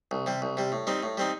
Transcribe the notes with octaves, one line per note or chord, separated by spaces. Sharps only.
C2
C3 G3
C2
C3 G3
A2
G3 C4 D#4
A2
G3 C4 D#4